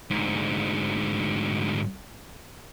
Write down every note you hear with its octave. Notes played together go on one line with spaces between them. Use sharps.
D2 G#2